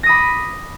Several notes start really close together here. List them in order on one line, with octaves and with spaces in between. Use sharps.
A#6 D#6 B5 D6